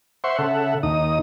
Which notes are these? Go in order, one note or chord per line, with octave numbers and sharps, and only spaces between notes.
C5 E5 F#5 C6 C#6
C#3 A4 E5 F#5
D#2 D#4 D#6